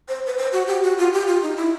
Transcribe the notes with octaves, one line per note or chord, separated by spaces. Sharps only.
C5
B4
C5
F#4
G4
F#4
F4
G4
F4
D#4
E4